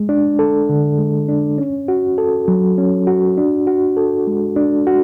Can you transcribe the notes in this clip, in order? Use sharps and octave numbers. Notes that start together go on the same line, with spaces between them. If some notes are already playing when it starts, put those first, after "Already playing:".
Already playing: G#3
D4
A4
D3
G#3
D4
C#4
F#4
A4
F#3
C#4
F#4
D4
F#4
A4
G#3
D4
F#4